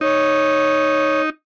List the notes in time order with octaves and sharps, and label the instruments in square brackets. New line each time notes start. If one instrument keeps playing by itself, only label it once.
[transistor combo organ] D#4 [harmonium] C#5